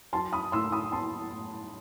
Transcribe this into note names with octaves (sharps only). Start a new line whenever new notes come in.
F#3 A5 C6
B5 D#6
A2 C6 E6
B5 D#6
B3 A5 C6
A2